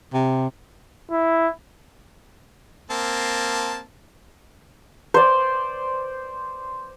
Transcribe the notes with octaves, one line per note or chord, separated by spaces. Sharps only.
C3
E4
A#3 C4 A5
C5 D5